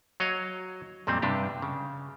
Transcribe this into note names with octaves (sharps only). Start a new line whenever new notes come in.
F#3 C#5 D#5 F5
F2 A#2 G3 A3 C4
G2 C3 D4 G4
C#3